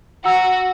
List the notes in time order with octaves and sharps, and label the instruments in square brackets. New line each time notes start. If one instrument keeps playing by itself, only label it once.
[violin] F#4 [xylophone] F#5 A#5 E6